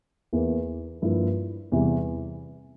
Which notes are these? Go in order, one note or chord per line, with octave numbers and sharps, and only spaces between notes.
E2 E3 A#3
G2 F3 A#3 E4
E2 C3 E3 G3